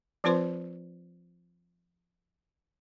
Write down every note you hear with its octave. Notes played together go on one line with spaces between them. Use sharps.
F3 C4 F4 B4 C5 C6